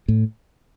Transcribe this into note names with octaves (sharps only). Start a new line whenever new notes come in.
A2